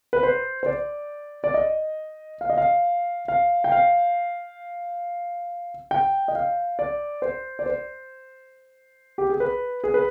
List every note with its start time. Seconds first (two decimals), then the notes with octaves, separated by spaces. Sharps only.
0.13 B4
0.23 C5
0.63 C5
0.66 D5
1.44 D5
1.54 D#5
2.41 F5
2.50 D#5
2.58 F5
3.28 F5
3.64 G5
3.72 F5
5.91 G5
6.28 D#5
6.35 F5
6.79 D5
7.22 C5
7.59 D5
7.66 C5
9.18 G4
9.30 G#4
9.40 B4
9.84 G#4
9.94 B4